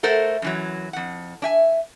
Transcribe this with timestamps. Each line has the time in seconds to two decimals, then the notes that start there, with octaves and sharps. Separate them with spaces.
0.03 A3 A4 A#4 C5 F#5
0.42 F#2 E3 F#3
0.93 F2 F#5
1.42 D4 E5 G#5